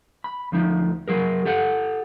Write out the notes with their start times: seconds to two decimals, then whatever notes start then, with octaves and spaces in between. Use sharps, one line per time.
0.24 B5
0.52 D2 F3 D#4
1.08 F#3 G#4 A#4
1.45 G4 A4 F#5